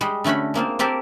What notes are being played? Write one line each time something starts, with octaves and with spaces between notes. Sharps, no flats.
G3 G#3
D3 A3 C#4 F#4 B5
G#3 A#3 C4 F4
A#3 C4 G4 A4 A#4